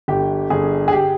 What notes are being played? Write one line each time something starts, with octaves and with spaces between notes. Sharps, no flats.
G1 G4
G1 G#4
G#4
G4